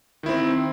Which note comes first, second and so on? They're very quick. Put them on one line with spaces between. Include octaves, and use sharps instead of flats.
D#3 E4 C4